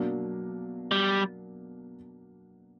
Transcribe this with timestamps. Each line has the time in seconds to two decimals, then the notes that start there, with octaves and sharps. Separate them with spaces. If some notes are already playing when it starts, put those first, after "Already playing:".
Already playing: B2 F#3 A#3 D4
0.91 G3